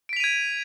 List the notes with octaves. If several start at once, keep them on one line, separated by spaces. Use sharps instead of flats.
G#6 B6 D7 D#7 F7